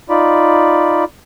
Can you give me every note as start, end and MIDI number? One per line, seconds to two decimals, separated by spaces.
0.10 1.04 63
0.10 1.04 65
0.10 1.04 74
0.10 1.04 83